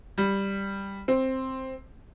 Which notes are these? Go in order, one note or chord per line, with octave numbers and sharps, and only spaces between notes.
G3
C4